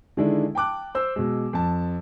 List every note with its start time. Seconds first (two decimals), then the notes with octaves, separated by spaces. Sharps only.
0.17 D3 D#3 G#3 D4 E4
0.55 G5 A5 D6 F#6
0.95 C5 E6
1.16 B2 G#3
1.53 F2 A5